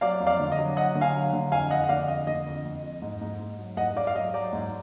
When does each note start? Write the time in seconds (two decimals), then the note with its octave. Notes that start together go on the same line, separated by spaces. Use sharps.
0.01 F#3 D5 F5
0.20 F2
0.27 D5 F5
0.39 D3
0.52 D#5
0.58 F#3
0.77 F#3 D#5 F#5
0.95 D3
1.01 F5 G#5
1.15 F#3
1.33 D3
1.52 F2 F5 G#5
1.71 F2 D#5 F#5
1.84 F#5
1.89 D3 D5 F5
2.08 F2 D#5
2.27 D3 D#5
2.46 F2
2.65 F2
2.83 F2
3.02 G#2
3.21 G#2
3.40 G#2
3.59 F#3
3.77 G#2 D#5 F#5
3.96 G#2 D5 F5
4.07 F5
4.15 F#3 D#5
4.34 F#3 D5
4.53 G#2